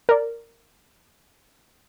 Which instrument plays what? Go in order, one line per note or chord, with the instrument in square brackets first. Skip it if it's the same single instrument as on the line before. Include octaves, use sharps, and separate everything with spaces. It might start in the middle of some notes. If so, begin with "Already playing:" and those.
[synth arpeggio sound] A#4 D5